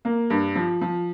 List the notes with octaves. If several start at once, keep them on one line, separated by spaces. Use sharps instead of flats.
A#3
G2
F3
F3